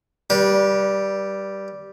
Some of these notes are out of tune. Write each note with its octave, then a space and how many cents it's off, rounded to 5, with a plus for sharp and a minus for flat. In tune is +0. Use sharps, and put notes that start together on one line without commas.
G3 -5 B4 -40